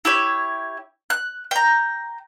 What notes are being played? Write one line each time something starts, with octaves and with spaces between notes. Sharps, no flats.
E4 G4 C#5
F#6
G5 A#5